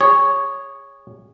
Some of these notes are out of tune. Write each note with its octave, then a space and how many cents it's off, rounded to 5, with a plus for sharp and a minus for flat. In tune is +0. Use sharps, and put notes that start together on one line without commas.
G#4 -25 C#5 +0